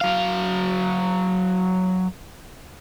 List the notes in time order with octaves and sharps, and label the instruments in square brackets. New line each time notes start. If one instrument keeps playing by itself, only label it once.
[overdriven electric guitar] F#3 F5